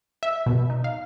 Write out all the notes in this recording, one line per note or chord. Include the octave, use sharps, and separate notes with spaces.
E5
B2
D#4
F5